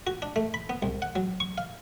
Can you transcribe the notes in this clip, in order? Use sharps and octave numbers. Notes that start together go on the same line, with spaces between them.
F#4
D4
A3
B5
B3
C2
F#5
F#3
C#6
F5